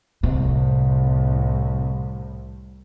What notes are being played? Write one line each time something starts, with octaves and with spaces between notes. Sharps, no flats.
C2 A2 C3